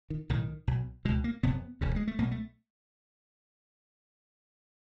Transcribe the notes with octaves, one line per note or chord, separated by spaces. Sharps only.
D#3
B1 A2 D#3
B1 B2
C#2 B2 G#3
A#3
F#1 F2 C3 B3
E1 D2 C#3
G#3
A3
B1 B2 A#3
A3